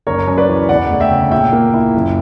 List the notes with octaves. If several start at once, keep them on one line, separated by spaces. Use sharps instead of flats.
F#1 A#4 C#5
F#2
B4 D5
E3
E1 D5 F#5
D2
E5 G5
C#3
A#2 E5 G5
A#3
E4
F#1